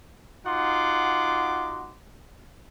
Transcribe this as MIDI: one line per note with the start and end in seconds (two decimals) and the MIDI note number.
0.46 1.94 63
0.46 1.94 65
0.46 1.94 66
0.46 1.94 78
0.46 1.94 84
0.46 1.94 86